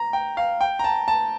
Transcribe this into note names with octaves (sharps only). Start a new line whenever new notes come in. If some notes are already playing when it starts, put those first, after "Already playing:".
Already playing: A#5
G5
F5
G5
A#5
A5
A5